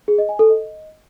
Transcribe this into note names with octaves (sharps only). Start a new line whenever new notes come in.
G#4
D#5
G#5
A4
D#5